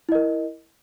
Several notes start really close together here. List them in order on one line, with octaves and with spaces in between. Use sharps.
E4 D#5 A#4